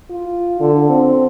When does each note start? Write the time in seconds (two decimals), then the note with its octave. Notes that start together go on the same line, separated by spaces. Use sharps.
0.10 F4
0.60 D3
0.89 C4